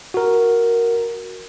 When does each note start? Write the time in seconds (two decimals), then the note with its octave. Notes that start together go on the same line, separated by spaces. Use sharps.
0.14 F#4 A#4